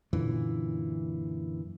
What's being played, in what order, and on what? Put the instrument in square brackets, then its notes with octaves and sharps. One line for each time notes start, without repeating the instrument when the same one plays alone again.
[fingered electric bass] F#2 A#2 D3 E3